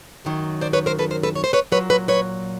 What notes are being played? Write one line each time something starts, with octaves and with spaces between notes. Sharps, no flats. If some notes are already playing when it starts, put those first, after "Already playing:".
F#2 D#3 F#3
C5 D5
B4 C#5
A#4 C5
A4 B4
A#4 C5
A4 B4
C#5
C5
B4 C#5
A#2 F#3 B4 C#5
B4 C#5
B4 C#5